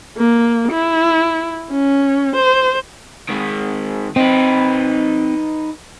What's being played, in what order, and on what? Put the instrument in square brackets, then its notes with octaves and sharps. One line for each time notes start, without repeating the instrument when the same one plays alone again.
[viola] A#3
E4
C#4
C5
[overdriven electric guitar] D#3 G#3
[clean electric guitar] C4 [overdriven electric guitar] D#4 B4